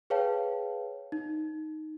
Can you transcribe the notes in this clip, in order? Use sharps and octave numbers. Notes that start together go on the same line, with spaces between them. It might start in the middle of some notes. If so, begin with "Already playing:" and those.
G#4 B4 C#5 F5 G5 A5
D#4